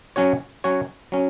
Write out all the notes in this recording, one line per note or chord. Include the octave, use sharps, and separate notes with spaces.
F#3 C#4 F#4 C#5
F#3 C#4 F#4 C#5
F#3 C#4